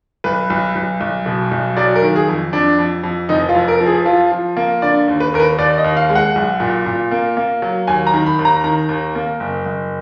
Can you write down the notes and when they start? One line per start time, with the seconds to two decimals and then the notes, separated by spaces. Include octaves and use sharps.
0.24 B1 B4
0.50 B1
0.75 B1
1.00 B1
1.26 B2
1.51 B1
1.77 F#3 D5
1.96 A#4
2.02 D#3
2.16 G#4
2.28 F2
2.53 F2 D4
2.78 F2
3.04 F2
3.29 F1 D#4
3.49 F4
3.55 F2
3.68 A#4
3.80 F3
3.86 G#4
4.05 F3 F4
4.32 F3
4.57 A#3
4.82 D3 D5
5.08 D#2
5.20 B4
5.34 D#2 A#4
5.40 B4
5.58 D#2 D5
5.78 D#5
5.84 D#2
5.97 F5
6.10 G#3
6.15 F#5
6.36 B1
6.60 A#2
6.86 A#2
7.11 A#3
7.37 A#3
7.62 F#3
7.87 D#2 G#5
8.07 A#5
8.14 D#3
8.26 B5
8.39 D#2
8.45 A#5
8.64 D#3 A#5
8.89 D#2
9.15 A#3
9.40 F#1
9.65 F#1